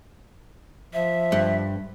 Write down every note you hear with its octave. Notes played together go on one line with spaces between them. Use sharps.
F3 E5
G2